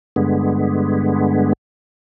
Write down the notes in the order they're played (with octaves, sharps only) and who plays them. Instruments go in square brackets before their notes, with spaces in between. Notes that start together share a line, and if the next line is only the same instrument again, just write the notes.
[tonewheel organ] G2 D3 G#3 B3